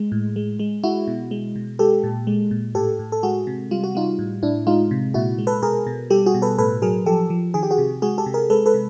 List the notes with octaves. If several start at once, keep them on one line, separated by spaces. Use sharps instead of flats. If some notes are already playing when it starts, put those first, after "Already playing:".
Already playing: G#3
A2
G#3
G#3
G#3 E4 F#4
B2
G#3
B2
G#3 G4 A4
A#2
G#3
A#2
A2 G4 A4
A2
A4
G#3 F#4 G#4
C3
G3 F4
F#4
G3 D#4 F4
A2
A2 D4 E4
G#3 D#4 F4
C3
A#2 E4 F#4
G#3
A4 B4
B2 G#4 A#4
B2
G3 G4 A4
F#4 G#4
B2
A4 B4
A2 A4 B4
F#3 G#4 A#4
F3 G4 A4
F3
D#3 G#4
G4
F#4 G#4
C3
G#3 F#4 G#4
G4 A4
C3
G#4 A#4
G#3 A4 B4
A4 B4
C3